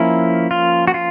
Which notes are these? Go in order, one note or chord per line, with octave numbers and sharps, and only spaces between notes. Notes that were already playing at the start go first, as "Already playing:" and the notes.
Already playing: F3 A#3 C#4 E4
F4
F#4
F4